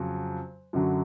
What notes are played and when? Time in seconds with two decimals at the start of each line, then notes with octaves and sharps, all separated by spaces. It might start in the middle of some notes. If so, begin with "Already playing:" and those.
Already playing: F2 C#3 F#3
0.73 F#2 D3 F#3